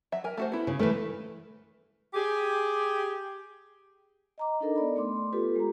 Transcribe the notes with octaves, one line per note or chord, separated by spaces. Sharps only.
F#3 E5
A#4 G#5
A3 F#4 C5
B3 E4
C#3
E3 A3 A#4 B4
G4 G#4
D#5 A#5 D6
D4 D#4 A4 A#4 D#5
B3 D5 B5
A3 B3 C6 D6
F4 G4 A4 B4
G#3 A#5